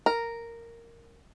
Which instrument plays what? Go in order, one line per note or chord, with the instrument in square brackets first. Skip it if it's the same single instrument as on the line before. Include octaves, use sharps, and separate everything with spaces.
[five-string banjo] A#4